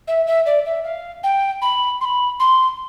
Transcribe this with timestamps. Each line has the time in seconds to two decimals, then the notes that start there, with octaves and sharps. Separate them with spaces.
0.07 E5
0.26 E5
0.46 D5
0.65 E5
0.84 F5
1.23 G5
1.61 B5
2.01 C6
2.04 B5
2.39 C6